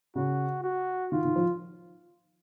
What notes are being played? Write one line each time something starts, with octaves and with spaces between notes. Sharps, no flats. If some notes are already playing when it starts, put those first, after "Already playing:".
C#3 F#4
F#4
D#3 F4
D#3
F3